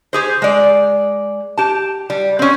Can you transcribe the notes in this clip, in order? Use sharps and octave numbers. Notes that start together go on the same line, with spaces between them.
G4 G#4 C5
G#3 D5
G4 A5
G3
C4 C#4